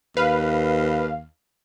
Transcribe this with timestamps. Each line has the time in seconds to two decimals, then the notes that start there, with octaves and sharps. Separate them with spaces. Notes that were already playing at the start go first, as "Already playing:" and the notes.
0.17 D#2 B4 F5